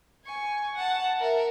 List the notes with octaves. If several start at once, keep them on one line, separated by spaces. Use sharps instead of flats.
G#5 C#6
F#5 A5
A#4 E5